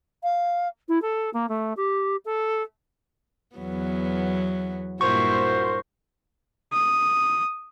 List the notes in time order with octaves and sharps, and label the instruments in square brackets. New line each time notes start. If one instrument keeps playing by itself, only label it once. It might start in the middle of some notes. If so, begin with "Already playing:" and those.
[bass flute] F5
E4
A4
A#3
A3
G4
A4
[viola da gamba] E2 F#3 B3
[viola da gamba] G2 A#2 E4 [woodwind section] F#4 A#4 C5 [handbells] C#6
[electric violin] D#6